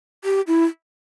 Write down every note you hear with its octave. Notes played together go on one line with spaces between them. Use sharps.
G4
E4